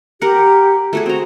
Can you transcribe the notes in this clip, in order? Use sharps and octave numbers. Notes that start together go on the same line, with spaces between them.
G4 A#4 F#5
A3 F#4 G#4
C4 F#4 A#5